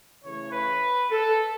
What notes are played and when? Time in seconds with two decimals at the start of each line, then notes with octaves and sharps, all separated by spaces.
0.23 C#3 E3 A3 C#5
0.52 B4
1.11 A4